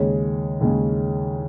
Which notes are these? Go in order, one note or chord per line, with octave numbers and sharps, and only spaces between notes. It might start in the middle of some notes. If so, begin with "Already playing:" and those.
Already playing: D#2 C#3 G#3 C#5
D#2 C#3 G#3